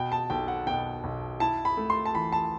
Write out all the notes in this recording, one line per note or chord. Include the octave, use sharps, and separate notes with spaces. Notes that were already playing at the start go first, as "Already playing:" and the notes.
Already playing: B2 G5
A5
B1 G5
F#5
B2 G5
B1
E4 A5
B5
A3
C6
A5
E3 B5
A5